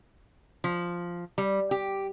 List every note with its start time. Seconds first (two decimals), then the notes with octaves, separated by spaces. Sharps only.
0.64 F3
1.38 G3
1.71 G4